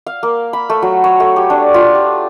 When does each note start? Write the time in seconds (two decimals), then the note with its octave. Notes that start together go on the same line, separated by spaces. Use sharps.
0.07 F5
0.23 A#3
0.53 B5
0.69 A3
0.82 F#3
1.04 C#5
1.20 A3
1.36 G4
1.50 D4
1.74 F4
1.95 G4